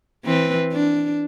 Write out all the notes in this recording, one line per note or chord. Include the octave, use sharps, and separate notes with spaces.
E3 C4 B4
D4